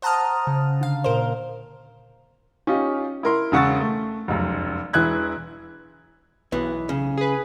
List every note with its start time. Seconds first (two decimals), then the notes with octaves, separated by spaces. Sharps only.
0.02 C5 F#5 A5 A#5 D#6 F6
0.47 C#3
0.81 D3 F5
1.04 A#2 A#4 C5
2.67 C#4 D#4 F4 G4
3.23 E4 A#4 C6
3.52 E1 C#3 F#5 C#6 E6 A6
3.81 A3
4.28 F1 C#2 F#2
4.93 E1 E3 E4 F#6 G#6
6.52 B1 E3 B3
6.89 C#3
7.17 G#4 B4